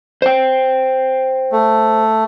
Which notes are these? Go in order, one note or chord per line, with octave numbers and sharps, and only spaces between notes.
C5 G5
A3